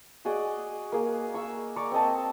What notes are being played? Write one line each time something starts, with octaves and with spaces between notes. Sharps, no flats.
F#4 G#4 D5 D#5
A#3 G#4
C#6 E6
D5 A#5 C#6 D6
C4 D#5 A5